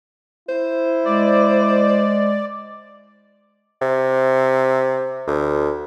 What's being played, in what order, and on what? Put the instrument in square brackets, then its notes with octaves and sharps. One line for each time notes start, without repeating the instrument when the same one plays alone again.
[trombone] E4 [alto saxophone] C5
[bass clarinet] G#3 [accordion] D5
[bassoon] C3
D2